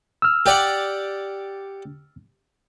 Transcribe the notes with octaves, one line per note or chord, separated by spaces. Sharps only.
E6 F6
G4 D5 F#5